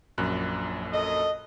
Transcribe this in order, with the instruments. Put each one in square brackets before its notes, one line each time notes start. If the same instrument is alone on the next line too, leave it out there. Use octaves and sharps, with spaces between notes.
[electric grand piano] A#1 F#2 F#6
[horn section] A4 D#5